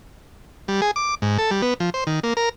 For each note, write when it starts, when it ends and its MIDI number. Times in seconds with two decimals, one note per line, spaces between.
0.68 0.81 55
0.82 0.91 68
0.96 1.15 86
1.22 1.38 44
1.38 1.51 69
1.51 1.62 55
1.62 1.74 59
1.80 1.90 53
1.94 2.04 72
2.07 2.20 51
2.23 2.34 58
2.37 2.49 70